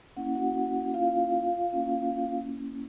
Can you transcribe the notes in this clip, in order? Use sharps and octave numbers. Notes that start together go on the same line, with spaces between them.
A#3 C#4 E4 F#5
F#4 F#5
F4 F5
A#3 C#4 E4